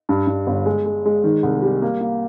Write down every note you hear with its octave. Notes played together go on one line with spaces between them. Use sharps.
G2
G2
G1
G#3
G#3
G#3
D#3
C2
G3
A#3
A#3